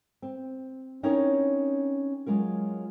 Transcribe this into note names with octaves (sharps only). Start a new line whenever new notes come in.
C4
C4 C#4 D#4 E4 A#4 C#5
F#3 G#3 F4 A#4